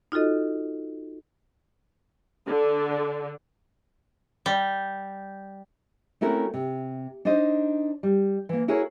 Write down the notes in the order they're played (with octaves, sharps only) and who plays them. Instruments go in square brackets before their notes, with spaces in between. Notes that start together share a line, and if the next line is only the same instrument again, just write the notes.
[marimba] D#4 F4 F#4 A4 D#5
[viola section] D3
[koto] G3
[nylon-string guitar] A3 C4 C#4 E4 F#4 A#4
C3
D4 D#4 C5 D#5
G3
E3 A#3
E4 F#4 G#4 A#4 C#5